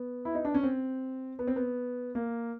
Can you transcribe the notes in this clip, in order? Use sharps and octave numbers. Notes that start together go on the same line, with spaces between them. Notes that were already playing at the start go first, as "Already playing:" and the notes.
Already playing: B3
E4
D#4
D4
C#4
C4
B3
C4
B3
A#3